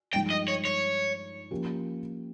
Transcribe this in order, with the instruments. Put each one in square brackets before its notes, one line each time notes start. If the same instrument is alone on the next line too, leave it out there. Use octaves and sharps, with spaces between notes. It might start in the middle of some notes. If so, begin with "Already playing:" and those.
[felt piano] G2 F3 G#3 D#4 [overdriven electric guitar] G5
[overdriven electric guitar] D#5
C#5
C#5
[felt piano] F3 A#3 C#4 G4 A#4